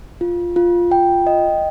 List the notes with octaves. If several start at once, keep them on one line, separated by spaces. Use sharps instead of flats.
F4
F4
G5
D#5